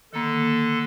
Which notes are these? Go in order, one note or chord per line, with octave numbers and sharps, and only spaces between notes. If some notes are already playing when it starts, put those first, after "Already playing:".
D3 D#3 A#3 A4